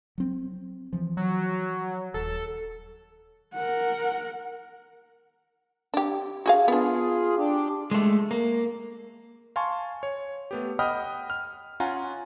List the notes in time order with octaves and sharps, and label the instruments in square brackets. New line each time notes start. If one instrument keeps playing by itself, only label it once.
[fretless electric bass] F#3 C4
E3 F3
[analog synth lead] F#3
[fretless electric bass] D#1 [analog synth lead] A4
[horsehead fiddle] A#4 F#5
[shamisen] D4 G4
F#4 G#4 F5
[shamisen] B3 D4 [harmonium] F4 G#4
[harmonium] D4 G4
[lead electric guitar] G#3 A3
A#3
[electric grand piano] F5 G#5 A5 C6 C#6
C#5
A3 B3 G4
D#5 F#5 G5 B5 D#6 F6
F6
C#4 F4 F#5 G#5 A#5